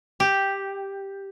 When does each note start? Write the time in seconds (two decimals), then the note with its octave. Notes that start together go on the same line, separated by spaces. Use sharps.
0.20 G4